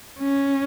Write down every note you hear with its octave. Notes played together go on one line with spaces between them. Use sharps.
C#4